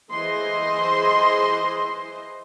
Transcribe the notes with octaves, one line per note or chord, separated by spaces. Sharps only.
E3 G#4 C5 D#5 C6